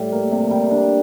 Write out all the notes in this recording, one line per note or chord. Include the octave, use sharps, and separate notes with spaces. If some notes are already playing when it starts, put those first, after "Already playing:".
Already playing: A2 G3
A#3
C3
G3
D4